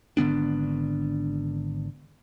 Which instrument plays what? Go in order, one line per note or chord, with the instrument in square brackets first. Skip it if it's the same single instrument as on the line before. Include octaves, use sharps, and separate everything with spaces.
[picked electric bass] G#1 D3 B3 D4